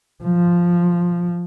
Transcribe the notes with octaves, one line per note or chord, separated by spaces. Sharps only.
F3